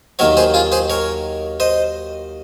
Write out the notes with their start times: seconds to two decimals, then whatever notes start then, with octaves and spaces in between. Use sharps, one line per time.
0.19 D#2 D#3 F#3 A#4 C#5
0.37 G#4 C5
0.54 F4 G#4
0.72 G#4 C5
0.90 A#4 C#5
1.60 C5 D#5